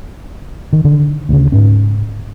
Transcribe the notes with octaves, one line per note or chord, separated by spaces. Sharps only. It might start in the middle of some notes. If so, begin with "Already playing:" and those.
D#3
D3
D2 C#3
G#2 C#4